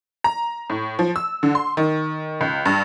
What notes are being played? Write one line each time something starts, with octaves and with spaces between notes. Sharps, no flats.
A#5
A2
F3
E6
D3
C6
D#3
C#2
G2